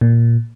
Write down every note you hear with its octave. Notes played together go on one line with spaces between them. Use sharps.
A#2